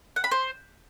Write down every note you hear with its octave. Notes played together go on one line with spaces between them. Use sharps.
F#5
B5
C5